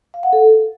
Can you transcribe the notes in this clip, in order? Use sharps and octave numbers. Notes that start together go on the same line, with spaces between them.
F5
F#5
A4